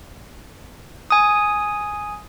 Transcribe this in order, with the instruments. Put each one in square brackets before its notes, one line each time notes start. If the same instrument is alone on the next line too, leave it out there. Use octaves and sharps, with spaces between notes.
[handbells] G#5 D#6